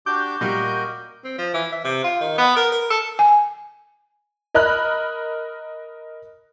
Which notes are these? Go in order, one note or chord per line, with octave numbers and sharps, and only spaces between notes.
D4 F#4 G4 D6 G6
A#2 G3 F#4 A#4 D#5
C4
F3
E3
E5
C3
F4
D#3
B3
A#4
A#4
A4
G#5
A#4 D#5 B5 F6 F#6